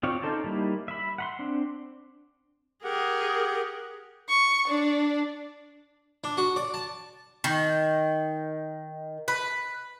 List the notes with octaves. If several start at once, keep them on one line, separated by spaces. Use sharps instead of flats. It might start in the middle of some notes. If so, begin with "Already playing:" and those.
C4 F4 C#5 D5
C#4 D#4 A4 C5 D5
G3 A#3 D#4 E4
E5 B5
F#5 B5 C6
C4 D4
G4 G#4 A#4 F#5
C#6
D4
D4
F#4
D5
A5
D#3
B4